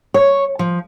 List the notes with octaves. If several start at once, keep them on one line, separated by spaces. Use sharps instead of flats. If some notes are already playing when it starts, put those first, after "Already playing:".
C#5
F3